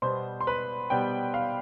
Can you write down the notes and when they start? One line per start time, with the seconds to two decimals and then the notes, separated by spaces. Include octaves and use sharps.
0.02 B2 G3 B3 C5 C6
0.41 C6
0.47 B4 B5
0.90 B2 G3 B3 G5
1.34 F5